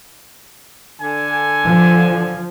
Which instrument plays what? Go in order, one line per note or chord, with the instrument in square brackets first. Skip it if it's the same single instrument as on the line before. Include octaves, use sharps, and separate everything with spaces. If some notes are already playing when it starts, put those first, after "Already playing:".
[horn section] D3 G#5
[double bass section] F3